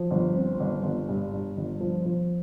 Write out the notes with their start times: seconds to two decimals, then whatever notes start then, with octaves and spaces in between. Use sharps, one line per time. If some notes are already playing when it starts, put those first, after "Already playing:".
Already playing: F3
0.11 G1
0.36 C4
0.60 G1
0.83 G1
1.09 G2
1.33 G2
1.57 G1
1.81 F3
2.06 F3